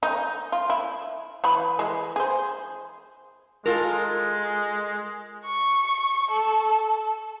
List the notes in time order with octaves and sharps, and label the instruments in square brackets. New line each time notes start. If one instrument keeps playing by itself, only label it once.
[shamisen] D#4
F4
E4
E3 B4 B5
E3 G#3
G#4 C5
[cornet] G#3 [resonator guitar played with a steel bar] F4 A4 A#4
[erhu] C#6
A4